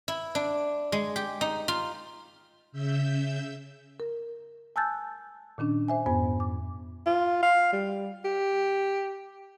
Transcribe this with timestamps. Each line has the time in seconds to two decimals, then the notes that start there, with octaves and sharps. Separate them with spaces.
0.08 E4
0.35 D4
0.92 G#3
1.16 G4
1.41 D#4
1.68 F4
2.72 C#3 E5 E6 G6
4.00 A#4
4.76 G#5 A5 E6 F#6 G6 A6
5.58 A#2 D#3 C#4 D4
5.88 C5 E5 G#5
6.06 F2 G#2 B3 C5 G#5
6.40 D6
7.06 F4
7.42 F5
7.73 G3
8.25 G4